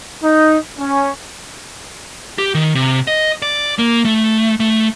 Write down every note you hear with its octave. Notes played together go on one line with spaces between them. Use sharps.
D#4
C#4
G4
D#3
C3
D#5
D5
A#3
A3
A3